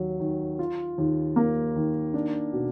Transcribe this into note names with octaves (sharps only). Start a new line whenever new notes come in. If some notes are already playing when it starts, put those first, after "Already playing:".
Already playing: D#2 F#3
D#3
F4
D#2
A#3
D#3
D4
B2